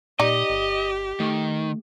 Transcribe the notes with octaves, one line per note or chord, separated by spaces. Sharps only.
A#2 D#4 G4 D5 D#5
G1
D#3 A3